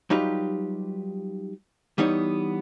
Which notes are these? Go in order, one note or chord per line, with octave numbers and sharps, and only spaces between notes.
F#3 G3 D#4 F4 G4 B4
E3 G3 B3 D#4 C#5